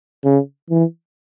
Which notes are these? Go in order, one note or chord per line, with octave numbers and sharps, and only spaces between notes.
C#3
E3